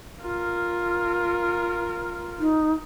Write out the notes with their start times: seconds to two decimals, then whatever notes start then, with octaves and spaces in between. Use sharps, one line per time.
0.22 F4 A#4
2.39 D#4